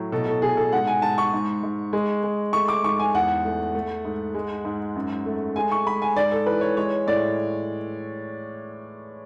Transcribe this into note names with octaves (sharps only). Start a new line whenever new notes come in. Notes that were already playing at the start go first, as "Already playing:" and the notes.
Already playing: A2 F#3
B2 A4
A4
B2 G#4
A4
G#2 F#5
G#5
G#2 A5
C#6
G#2
G#2
G#3
G#3
A3 C#6
D6
G#2 C#6
G#5
E2 F#5
A3
A3
G#2
G#3
G#2
F#2
A3
G#3 G#5
C#6
G#3 B5
G#5
G#2 D5
A4
E3 B4
C#5
G#3 C#5
A2 D5